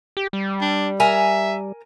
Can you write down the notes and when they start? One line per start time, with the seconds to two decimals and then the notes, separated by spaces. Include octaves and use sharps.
0.17 G4
0.33 G3
0.61 D4
1.00 A#4 E5 G#5 A#5